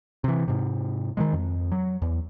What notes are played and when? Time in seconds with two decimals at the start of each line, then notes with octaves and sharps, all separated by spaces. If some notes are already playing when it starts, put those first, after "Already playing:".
0.24 C3 E3
0.48 G#2 C3
1.17 D#3 F#3 G#3
1.33 F2
1.72 F#3
2.02 E2